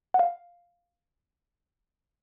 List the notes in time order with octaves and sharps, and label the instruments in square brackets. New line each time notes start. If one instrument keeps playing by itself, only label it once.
[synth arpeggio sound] F#5
F5